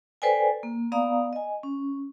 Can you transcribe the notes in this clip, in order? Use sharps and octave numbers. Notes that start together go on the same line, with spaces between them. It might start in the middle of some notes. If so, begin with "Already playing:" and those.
A4 B4 C5 D5 G5 G#5
A#3
B3 D5 F5 A#5 D#6
D#5 G#5
C#4